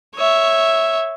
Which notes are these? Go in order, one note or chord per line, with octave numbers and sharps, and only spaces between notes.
C#5 E5